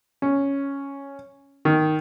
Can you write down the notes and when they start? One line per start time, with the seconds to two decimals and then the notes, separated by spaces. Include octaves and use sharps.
0.22 C#4
1.65 D#3